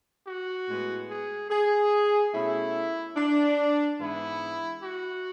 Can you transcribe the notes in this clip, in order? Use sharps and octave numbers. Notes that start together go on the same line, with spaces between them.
F#4
A2 G#3 B3
G#4
G#4
B2 A3 C#4 E4
D4
G#2 E3 B3 E4
F#4